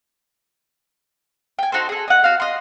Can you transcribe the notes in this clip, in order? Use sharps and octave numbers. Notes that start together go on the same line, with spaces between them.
G5 G#5
D#4 F#4 A4 C5
G#4 A4
D#5 F#5
F#4 F5
D#5 C6